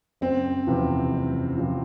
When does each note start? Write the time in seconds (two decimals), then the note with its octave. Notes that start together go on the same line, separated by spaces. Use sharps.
0.21 F#1 C4
0.67 E2 C3 F3
1.12 F#1
1.58 C3 F3